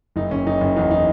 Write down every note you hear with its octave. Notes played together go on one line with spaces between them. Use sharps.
F#1 D#4
F#1 C#4
F#1 D#4
F#1 C#4
E2 D#4
D#4